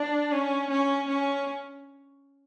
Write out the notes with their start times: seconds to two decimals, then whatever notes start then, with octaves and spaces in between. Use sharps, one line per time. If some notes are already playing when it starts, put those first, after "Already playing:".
Already playing: D4
0.32 C#4
0.70 C#4
1.08 C#4